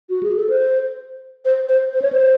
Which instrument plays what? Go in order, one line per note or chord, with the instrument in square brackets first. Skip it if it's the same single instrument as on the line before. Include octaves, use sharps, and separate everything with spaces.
[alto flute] F#4
G#4
A4
C5
C5
C5
C5
C#5
C5